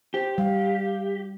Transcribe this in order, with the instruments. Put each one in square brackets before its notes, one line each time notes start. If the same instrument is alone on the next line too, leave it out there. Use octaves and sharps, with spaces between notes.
[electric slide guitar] G4 [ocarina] C5
[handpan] G3 [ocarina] F5